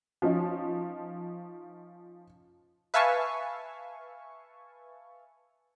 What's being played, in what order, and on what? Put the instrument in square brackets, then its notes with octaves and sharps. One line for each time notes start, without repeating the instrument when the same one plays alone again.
[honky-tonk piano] F3 C#4 D#4
[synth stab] B4 E5 F5 G#5 A5 C#6